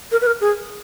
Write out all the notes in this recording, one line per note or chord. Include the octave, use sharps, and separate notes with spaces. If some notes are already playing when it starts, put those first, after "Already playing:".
A#4
B4
A#4
G#4